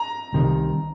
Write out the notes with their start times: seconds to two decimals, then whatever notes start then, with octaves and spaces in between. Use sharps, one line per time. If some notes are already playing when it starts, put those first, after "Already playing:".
Already playing: A#5
0.33 C2 C3 D#3